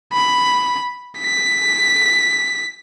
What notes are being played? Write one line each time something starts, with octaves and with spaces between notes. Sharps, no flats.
B5
B6